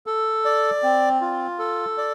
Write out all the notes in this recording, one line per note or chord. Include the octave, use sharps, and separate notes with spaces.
A4
D5
C4
F4
A4
D5